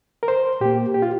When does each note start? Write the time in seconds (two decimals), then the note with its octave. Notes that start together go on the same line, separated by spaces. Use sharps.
0.23 A#4
0.28 C5
0.61 A#2 A#3 G4
0.94 G4
1.02 F4